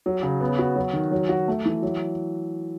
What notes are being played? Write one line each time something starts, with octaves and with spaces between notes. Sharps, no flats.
F#3
C#3
B3
F#4
F#3
D#3
F#3
F#4
A3
E3
F#3